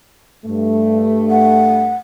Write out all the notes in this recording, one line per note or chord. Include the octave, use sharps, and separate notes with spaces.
G2 A3
F#5